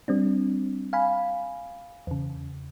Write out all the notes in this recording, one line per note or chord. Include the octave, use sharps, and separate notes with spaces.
G3 C4 D4
F5 G#5 B5
E2 C#3